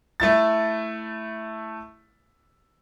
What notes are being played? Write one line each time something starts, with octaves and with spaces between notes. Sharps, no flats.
A3 E4 A6